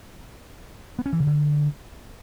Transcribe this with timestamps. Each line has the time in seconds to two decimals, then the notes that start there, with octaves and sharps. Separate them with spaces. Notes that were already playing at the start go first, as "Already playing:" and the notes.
0.99 B3
1.06 C#4
1.13 E3
1.20 C#3
1.27 D3